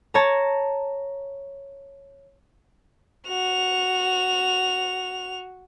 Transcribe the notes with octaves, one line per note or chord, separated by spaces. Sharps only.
C#5 A5 A#5
F#4 F7